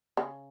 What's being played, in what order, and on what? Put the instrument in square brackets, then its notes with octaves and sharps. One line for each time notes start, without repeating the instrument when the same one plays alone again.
[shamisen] C#3